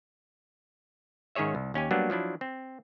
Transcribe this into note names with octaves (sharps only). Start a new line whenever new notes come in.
G#2 D#3 C#4 G#4 C#5 E5
C2
D#2 C#4 G4 G#5
F#3 G3 A#3 B3 D4
F3 F#3 D4 E4
C4